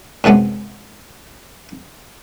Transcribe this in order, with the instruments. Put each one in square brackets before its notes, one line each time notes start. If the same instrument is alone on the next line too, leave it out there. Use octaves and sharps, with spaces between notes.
[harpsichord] F#2 C3 F3 G#3 B3